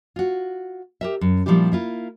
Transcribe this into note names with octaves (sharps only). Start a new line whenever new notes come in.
F4 F#4
G4 A#4 E5
F#2
A#2 F3 G3 D4 E4 G4
A#3 E4 F4